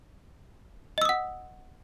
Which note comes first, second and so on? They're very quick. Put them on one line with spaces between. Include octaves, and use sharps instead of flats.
D#5 E6 D#6 F#5